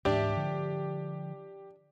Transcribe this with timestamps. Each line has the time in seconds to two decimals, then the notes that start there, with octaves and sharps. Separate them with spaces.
0.05 D2 G#2 E3 D4 G4 E5
0.37 D3 F3